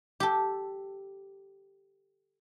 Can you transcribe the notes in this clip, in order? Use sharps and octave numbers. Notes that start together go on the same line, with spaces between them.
G4 A4